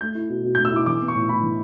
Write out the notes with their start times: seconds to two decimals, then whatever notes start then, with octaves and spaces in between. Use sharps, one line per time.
0.01 A3 G6
0.15 E4
0.30 B2
0.44 B2
0.55 G6
0.58 A3
0.65 E6
0.72 E4 D6
0.86 E3 D6
1.02 B3
1.08 C#6
1.15 A2
1.29 A2 B5
1.43 E3